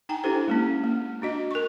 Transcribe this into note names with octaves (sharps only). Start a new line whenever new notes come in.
D#4 G5 G#5 A#5
D4 E4 G4 A4 C5
G#3 A#3 C#4
A#3
D4 F#4 D#5
A#4 C#6